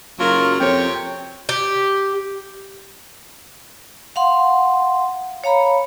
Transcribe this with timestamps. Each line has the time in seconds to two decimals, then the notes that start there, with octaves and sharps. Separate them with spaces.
0.19 F#1 F#3 F4 A#4
0.60 F2 C3 C#5 G5
1.49 G4
4.16 F5 F#5 C6
5.44 C#5 F5 A#5 B5